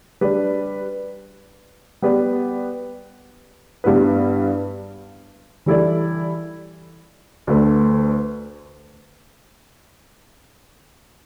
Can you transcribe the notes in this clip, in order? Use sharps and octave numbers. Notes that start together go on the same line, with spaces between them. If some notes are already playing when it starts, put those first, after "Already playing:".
G3 D4 B4 D5
G3 B3 G4 B4 D5
G2 G3 B3 E4 B4
E3 G3 E4 A4 D5
D2 D3 A3 D4 B4